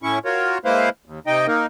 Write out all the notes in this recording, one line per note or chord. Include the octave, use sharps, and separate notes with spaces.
A2 C#4 E4 C#6
F4 F#4 A#4 C#5
G#3 A#3 E4 B4 C5 F5
D#2
C3 D#4 D#5 G5
A#3 D#4 A#4